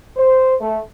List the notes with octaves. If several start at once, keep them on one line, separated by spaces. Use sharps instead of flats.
C5
A3